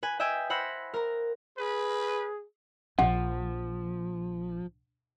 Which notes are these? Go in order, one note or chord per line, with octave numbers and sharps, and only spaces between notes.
B4 G#5
D#5 E5 G5 G#5 E6
C5 F#5 B5 E6 A#6
A#4 A#5
G#4 B4
A#1 F3 F#5